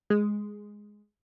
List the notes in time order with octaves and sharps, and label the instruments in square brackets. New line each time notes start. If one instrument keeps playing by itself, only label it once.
[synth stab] G#3